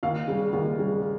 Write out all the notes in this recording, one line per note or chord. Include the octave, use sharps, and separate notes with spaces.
D#2 F5
C#3 G3
D#2
C#3 G3